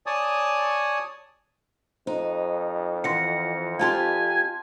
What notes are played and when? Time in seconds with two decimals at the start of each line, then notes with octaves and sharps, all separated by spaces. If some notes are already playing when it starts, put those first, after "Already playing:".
0.06 C#5 D5 G#5 A5 D#6
2.07 F2 D#4 C5
3.04 E3 F#5 C6 A#6 C#7
3.79 C4 F4 G4 F5 G#5 A5 C6